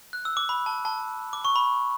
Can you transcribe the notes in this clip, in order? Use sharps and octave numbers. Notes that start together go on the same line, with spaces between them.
F#6
E6
D6
B5
A5
A5
D6
C#6
B5